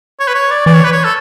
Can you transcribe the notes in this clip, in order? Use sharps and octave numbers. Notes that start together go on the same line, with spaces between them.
C#5
B4
C#5
D5
E3 D5
C#5
B4
C#5
A4